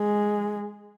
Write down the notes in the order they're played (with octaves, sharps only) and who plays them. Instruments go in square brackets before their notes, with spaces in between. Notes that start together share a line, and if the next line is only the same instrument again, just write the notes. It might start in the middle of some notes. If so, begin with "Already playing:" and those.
Already playing: [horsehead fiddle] G#3